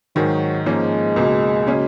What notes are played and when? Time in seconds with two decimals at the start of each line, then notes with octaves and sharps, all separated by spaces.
0.16 G#2 D#3 F#3 G#3
0.66 G#2 F3 G#3 A#3 C#4
1.16 C#2 B2 A#3
1.67 C#3 F#3 A#3 C#4